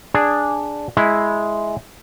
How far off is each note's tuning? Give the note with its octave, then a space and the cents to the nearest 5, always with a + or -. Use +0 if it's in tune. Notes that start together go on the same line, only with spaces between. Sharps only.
D4 +0 G#4 -5
G#3 +5 E4 -5